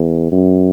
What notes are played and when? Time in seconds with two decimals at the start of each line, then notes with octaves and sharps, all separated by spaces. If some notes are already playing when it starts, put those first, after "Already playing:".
Already playing: E2
0.32 F#2